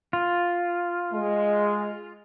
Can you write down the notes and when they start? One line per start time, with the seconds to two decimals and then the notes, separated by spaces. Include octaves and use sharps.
0.13 F4
1.13 G#3